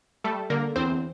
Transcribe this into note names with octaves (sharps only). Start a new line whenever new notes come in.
G3 A3 A4
D3 A#3 A#4
E2 C4 C5